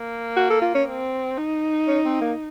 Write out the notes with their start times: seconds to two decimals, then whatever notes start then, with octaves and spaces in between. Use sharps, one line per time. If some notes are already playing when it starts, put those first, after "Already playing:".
Already playing: A#3
0.37 F#4
0.50 A4
0.62 F4
0.75 C#4
0.87 C4
1.38 D#4
1.88 C#4
2.05 C4
2.21 A#3